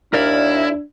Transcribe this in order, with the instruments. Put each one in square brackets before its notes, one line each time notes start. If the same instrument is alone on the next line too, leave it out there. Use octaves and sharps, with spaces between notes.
[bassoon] D#2 [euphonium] D4 [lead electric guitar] E4 [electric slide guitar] A#4 D5 F5